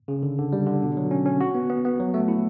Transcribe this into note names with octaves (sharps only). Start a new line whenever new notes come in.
C#3
D3
D3
G3
D3
B2
F#3
C#4
C#4
F#4
B3
B3
B3
F#3
A3
E4